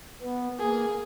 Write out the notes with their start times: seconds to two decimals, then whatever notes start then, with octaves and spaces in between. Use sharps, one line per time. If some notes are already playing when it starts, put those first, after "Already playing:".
0.22 B3
0.59 A#3 G#4